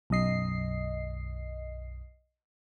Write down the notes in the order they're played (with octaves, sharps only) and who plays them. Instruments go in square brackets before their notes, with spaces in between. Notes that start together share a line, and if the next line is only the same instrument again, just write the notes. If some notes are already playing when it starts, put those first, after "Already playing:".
[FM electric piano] B1 F#2 D#5 C7